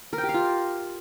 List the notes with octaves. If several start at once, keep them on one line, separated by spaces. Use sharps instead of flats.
A#4
G5
G4
F5
F4